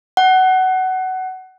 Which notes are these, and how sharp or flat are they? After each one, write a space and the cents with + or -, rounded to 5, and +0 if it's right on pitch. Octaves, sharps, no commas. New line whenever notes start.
F#5 +20